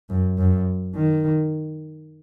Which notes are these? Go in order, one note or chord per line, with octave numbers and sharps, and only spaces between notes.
F#2
F#2
D#3